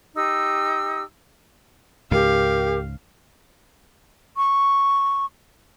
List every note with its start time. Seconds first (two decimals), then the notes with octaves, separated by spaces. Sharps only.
0.15 D#4 G4 E6
2.11 C#2 G#2 G4 A#4 F5
4.37 C#6